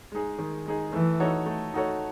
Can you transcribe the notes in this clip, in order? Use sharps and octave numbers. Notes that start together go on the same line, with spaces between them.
G#3 D#4 G#4
D#3
G#3 D#4 G#4
E3 A3
D#4 F#4 A4 C#5
A3
D#4 F#4 A4 C#5